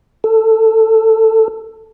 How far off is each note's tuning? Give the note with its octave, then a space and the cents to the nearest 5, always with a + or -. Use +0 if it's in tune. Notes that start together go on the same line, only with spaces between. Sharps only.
A4 +15